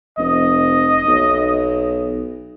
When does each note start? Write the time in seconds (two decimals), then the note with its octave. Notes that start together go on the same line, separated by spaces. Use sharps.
0.18 F1 D#5
1.07 B1